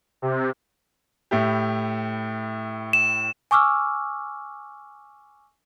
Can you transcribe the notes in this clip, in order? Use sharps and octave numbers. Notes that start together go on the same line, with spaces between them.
C3
A2 E4 G4
E7
G#5 C#6 D6 E6 F6